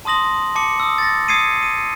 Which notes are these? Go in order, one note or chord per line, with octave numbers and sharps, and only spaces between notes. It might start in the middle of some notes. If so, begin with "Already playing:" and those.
A5 C6 D#6 A#6 F#7
A5 D6 C#7
D#6 E6
A6 A#6
D#6 G#6 C7 C#7 D#7
D#7